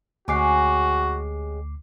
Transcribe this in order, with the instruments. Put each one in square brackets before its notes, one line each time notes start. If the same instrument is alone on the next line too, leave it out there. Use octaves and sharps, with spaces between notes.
[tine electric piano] D2 D6 C7 [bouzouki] G#3 C#4 G4 [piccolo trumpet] F#4